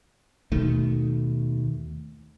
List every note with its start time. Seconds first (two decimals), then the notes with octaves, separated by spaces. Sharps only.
0.52 D#2 B2 D#3 A3